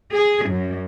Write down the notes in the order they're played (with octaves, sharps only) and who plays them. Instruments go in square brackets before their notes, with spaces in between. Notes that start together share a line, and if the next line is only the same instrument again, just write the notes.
[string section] G#4
F#2